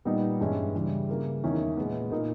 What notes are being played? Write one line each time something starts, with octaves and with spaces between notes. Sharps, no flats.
A#2 G3 B3 D#4
G2 E3 G#3 C#4 E4
C#3 E3 G3
C#3 E3 A#3
E2 D#3 A#3 C#4 E4
A#2 G#3 B3
A#2 A#3 D#4